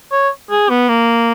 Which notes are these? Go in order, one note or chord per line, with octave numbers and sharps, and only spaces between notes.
C#5
G#4
B3
A#3